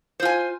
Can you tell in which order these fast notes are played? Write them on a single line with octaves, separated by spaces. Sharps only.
C5 F4 G#5